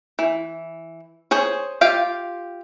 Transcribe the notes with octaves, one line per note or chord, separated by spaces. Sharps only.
E3
G#4 C5 C#5
F4 G4 F5 G5